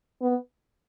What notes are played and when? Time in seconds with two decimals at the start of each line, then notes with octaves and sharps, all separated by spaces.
0.21 B3